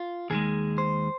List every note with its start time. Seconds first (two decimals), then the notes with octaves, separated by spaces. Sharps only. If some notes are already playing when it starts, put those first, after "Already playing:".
Already playing: F4
0.30 D#2 D#3 G#3 G#4
0.78 C5